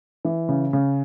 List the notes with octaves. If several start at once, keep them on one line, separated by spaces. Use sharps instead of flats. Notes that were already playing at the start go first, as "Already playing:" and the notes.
E3
C#3
C#3